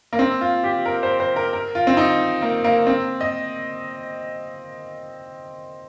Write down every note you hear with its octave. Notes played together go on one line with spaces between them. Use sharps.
A#3
C4
F4
G4
A#4
C5
C5
A#4
A#4
F4
C4
D#4
A#3
A#3
C4
D#5